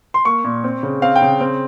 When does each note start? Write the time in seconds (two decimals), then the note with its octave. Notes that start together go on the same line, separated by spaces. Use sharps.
0.14 C6
0.25 A#3 C#6
0.44 A#2
0.64 C4
0.83 C#3
1.02 C4 F5
1.16 G5
1.22 C#3
1.41 C4